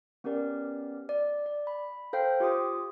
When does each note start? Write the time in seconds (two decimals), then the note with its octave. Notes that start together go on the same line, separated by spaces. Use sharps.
0.24 B3 C#4 G4 A#4 D5
1.09 D5
1.46 D5
1.67 B5
2.13 A4 C5 F5 G5 G6
2.40 F4 G4 C6 D6 D#6